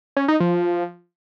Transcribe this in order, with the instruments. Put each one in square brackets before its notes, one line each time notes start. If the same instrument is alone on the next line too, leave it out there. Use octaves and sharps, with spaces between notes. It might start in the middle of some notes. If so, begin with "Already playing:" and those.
[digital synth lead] C#4
D#4
F3